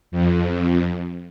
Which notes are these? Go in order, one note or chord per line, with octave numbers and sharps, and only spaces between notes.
F2